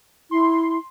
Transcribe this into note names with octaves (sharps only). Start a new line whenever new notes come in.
E4 C6